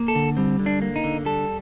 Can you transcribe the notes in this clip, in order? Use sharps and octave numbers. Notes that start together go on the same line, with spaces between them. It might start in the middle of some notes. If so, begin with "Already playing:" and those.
Already playing: A#3
A4
D3
G3 C4
D3
D4
A#3
D#4
D3
G3 A4